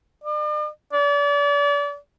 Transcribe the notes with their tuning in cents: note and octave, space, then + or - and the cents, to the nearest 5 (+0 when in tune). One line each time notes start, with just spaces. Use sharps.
D5 +45
D5 -35